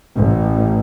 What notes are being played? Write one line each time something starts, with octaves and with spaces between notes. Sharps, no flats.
A1